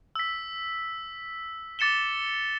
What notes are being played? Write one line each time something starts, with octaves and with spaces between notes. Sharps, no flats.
E6 B6
D6 A6 C#7 E7 G7